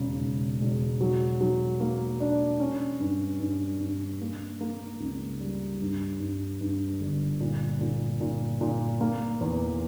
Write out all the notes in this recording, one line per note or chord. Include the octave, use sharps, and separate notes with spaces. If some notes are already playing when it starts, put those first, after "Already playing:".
Already playing: E1 C#3
E1
E1
F#3
F#3
A#3
D4
C#4
G2
G2
G2
A#3
A#3
C#2
G3
G2
G2
G2
G1
A#2
A#2
A#2
A#2
A#3
E2